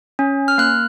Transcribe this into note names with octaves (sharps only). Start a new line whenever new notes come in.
C#4
F6
A#3 F#6